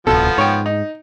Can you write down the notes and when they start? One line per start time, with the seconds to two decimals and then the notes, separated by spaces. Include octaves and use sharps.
0.07 D1 C2 B2 F3 B3 A4
0.38 G#2 C#5 G5
0.66 D#4